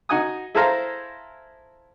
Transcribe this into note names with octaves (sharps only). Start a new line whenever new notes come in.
D#4 F#4 G#5 D#6
E4 G#4 A4 C5 F5 A#5